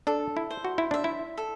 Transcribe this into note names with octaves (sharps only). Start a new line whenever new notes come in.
D4 A4
E4
C5
F#4
E4
D4 E5
E4
A4